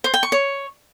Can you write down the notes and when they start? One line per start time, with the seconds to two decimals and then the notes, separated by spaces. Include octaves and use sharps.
0.04 C5
0.14 G5
0.23 C#6
0.32 C#5